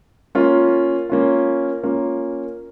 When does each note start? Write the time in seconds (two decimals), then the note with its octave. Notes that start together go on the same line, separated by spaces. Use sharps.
0.35 A#3 C#4 F4
1.10 A#3 C#4 F4
1.83 A#3 C#4 F4